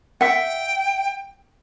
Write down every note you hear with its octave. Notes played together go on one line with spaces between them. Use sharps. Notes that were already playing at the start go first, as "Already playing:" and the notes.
E5 F#5 G5